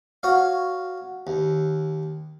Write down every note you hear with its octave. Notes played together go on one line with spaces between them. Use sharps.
F#4 C#5 F5
D#2